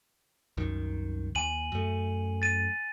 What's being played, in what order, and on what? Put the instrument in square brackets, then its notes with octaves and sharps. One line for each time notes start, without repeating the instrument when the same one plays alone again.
[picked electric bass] C2 F#2 D#3
[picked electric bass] D#2 [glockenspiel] G#5 D#7 F#7
[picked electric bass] F#2 A3
[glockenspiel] A6 D#7